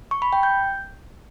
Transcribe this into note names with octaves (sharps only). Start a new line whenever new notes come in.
C#6
B5
G5
G6